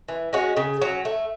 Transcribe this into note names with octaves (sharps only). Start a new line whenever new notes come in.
E3
G#3 C#4 F#4
C#3
F#3 C#4
A3